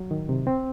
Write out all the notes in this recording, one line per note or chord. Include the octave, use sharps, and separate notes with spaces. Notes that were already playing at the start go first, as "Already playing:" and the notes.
Already playing: F#3
D#3
C3
C4